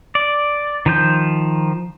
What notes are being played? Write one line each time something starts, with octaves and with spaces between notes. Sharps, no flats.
D5
D#3 F3 G6